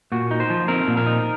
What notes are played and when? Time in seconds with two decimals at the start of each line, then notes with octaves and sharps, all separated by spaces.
0.12 A#2 F#4
0.31 D#4
0.40 C5
0.50 F3
0.68 C4 A#4
0.88 A#2
0.97 A#4
1.06 D#4